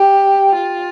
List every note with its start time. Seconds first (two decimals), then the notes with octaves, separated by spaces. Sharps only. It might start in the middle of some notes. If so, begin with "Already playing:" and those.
Already playing: G4
0.55 F4